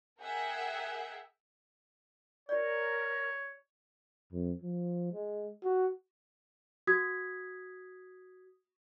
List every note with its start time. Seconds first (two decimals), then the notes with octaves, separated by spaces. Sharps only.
0.23 G#4 A#4 E5 F#5 G5
2.49 F#4 A#4 C#5 D5
4.33 F2
4.62 F3
5.12 G#3
5.64 F#4
6.87 F#4 D#6 G#6 B6